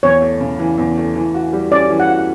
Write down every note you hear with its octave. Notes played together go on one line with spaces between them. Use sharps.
E2 C#5
A3
C#3
E3
E2
A3
E3
F#4
G3
C#4 D5
E3
F#5
F#4